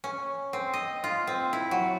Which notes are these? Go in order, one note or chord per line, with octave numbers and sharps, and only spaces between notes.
C#4
C4
D#5
F4
C4
E4
F#3